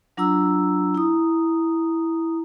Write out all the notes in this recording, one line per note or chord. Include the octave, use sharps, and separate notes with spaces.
F#3 D4 F4 A#5 E6
E4 A#5 D#6